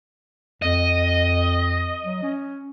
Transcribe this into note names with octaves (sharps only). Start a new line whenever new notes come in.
F2 D#5
F#3
C#4